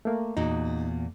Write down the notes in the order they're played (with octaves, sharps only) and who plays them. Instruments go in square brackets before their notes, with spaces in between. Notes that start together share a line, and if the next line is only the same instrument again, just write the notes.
[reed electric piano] A3 A#3
[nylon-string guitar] E2 A#2 F#4 [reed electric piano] D#4